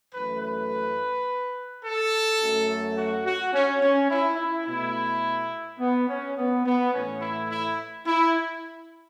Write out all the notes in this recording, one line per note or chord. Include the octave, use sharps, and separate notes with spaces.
F#2 E3 A3 B4
B4
A4
F#2 F#3 A3
F#4
F#4
C#4
C#4
E4
E4
B2 A3 E4
B3
C#4
B3
B3
A2 E3 A3 C#4
E4
E4
E4